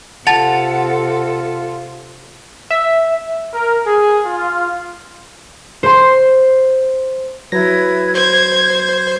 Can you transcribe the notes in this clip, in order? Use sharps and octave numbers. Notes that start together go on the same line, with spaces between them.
C3 F4 A4 F#5 A5 A6 F7
E5
A#4
G#4
F4
C5 C6
F#3 E4 B4 G#6 A#6
C5 G6 G#6